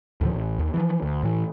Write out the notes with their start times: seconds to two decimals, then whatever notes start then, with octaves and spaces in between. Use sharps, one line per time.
0.21 D2 A2 D3 F3
0.33 A1
0.59 D#2
0.74 E3 F3
1.02 D2
1.23 A2 E3